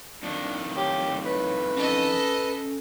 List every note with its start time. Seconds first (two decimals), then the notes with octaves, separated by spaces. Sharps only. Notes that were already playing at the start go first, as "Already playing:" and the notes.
0.23 F2 D#3 D4
0.77 G4 C#5
1.25 B4
1.76 C#4 A4 D#5